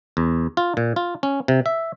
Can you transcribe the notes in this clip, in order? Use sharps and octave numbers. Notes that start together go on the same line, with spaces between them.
E2
F4
A#2
F4
C#4
C3
E5